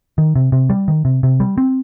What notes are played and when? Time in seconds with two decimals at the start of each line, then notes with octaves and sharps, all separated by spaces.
0.18 D#3
0.36 C3
0.52 C3
0.70 G3
0.88 D#3
1.05 C3
1.23 C3
1.40 G3
1.58 C4